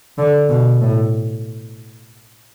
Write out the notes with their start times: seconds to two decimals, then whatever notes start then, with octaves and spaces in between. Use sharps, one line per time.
0.18 D3
0.49 B2
0.81 A2